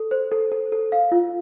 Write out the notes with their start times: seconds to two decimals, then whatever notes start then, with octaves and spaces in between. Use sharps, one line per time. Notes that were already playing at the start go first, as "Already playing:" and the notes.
Already playing: A4
0.11 C5
0.32 A4
0.52 A4
0.72 A4
0.92 F5
1.12 F4